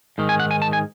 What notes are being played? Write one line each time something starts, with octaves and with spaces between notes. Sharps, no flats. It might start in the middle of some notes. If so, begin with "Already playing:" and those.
G#2 D#3
G#5
F#5
G#5
A5
G#5